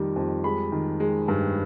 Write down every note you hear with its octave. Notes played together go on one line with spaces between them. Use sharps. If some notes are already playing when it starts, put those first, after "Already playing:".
Already playing: F2 D#3 G3
F2
G#3 B5
D#3
G#3
G2